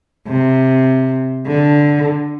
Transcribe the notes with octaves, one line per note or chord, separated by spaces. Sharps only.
C3
D3